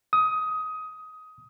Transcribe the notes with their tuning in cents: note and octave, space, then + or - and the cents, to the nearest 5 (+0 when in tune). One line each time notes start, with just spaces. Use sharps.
D#6 +15